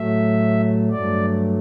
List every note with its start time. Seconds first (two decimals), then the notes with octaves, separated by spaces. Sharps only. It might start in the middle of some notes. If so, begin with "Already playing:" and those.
Already playing: A2 F#3 A3 E5
0.91 G2 F#3 A3 D5